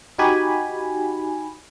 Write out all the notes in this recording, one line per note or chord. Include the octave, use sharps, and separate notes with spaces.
D#4 F#4 G4 G#5 B5